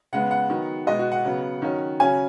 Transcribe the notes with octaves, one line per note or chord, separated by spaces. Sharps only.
C#3 G#3 B3 F#5
F#5
D#3 F#3 B3
B2 G#3 B3 D#5
F#4
F#5
C#3 F#3 B3
D#3 F#3 C#4
C#3 F#3 C#4 G#5